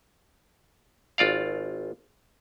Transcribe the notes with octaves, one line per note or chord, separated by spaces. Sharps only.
G#1 F4 D5 F5